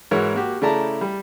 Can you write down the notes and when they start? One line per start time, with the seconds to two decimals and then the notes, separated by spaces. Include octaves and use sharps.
0.11 G#2 E3 F#4 A#4 C#5 E6
0.35 A#3 F#4 G4
0.62 C#3 A3 E4 D5 A5 A#5
1.01 G3